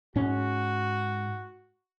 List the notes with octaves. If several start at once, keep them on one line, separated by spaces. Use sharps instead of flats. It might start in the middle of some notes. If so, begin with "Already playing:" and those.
G#2 C#4 F#4